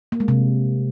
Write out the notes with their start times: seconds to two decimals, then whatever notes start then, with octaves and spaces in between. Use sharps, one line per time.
0.12 A#3
0.20 G#3
0.28 C3